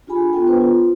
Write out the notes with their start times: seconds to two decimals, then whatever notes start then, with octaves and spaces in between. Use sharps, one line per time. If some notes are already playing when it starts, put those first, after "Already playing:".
0.07 D4 F4 G4 G#4 G#5 B5
0.33 B3 D4 F4 A4 G5
0.47 B3 B4 C5
0.61 F4